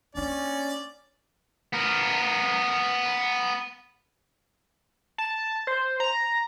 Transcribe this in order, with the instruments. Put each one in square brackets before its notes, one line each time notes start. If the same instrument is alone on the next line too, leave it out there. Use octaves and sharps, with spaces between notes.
[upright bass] A#3 D4 [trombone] C#4 [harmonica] D5
[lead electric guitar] B3 A#4
[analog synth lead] A5
C5
A#5